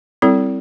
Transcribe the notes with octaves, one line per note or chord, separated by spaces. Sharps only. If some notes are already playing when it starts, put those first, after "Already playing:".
G3 C4 E4 A4